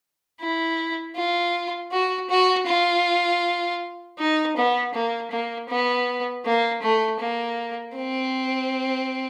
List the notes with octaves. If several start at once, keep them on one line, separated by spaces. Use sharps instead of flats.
E4
F4
F#4
F#4
F4
D#4
B3
A#3
A#3
B3
A#3
A3
A#3
C4